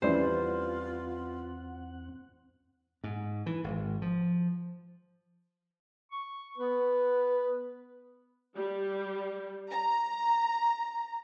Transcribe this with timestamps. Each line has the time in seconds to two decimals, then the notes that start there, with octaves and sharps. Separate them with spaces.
0.02 E2 E3 G3 C4 C#4 F4 C5 F#5
3.04 G#2
3.46 E3
3.64 G#1
4.02 F3
6.12 C#6
6.58 B3 B4
8.56 G3
9.72 A#5